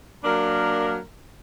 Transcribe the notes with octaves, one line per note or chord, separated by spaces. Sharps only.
F#3 A#3 D4 A#4